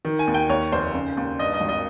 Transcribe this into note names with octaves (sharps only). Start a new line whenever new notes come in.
D#3
G#5
D#2
G5
D#2 C#5
F1 C5
C#3
D#2
G2 D#5
D#5
G#1
D#5